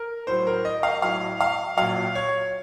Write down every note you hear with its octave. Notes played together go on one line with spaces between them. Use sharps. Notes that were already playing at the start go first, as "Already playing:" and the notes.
Already playing: A#4
A2 F#3 C5
A#4
D#5
F5
A2 F#3 F5
F5
A#2 F#3 F5
C#5